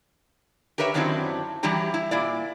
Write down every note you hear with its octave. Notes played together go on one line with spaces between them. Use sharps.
G4 A#4 B4 C#5 E5
F#2 D#3 F#3 C4 D4 E4
E3 F#3 G3 E4 G4 A#5
E4
A#2 E4 D5